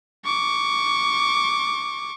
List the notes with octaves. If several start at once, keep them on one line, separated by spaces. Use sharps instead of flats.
C#6 D6